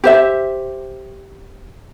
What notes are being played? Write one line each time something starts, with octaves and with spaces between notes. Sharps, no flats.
G4 C5 E5